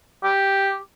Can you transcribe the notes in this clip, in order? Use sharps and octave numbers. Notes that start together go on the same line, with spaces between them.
G4